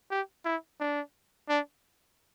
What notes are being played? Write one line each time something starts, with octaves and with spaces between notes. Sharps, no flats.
G4
E4
D4
D4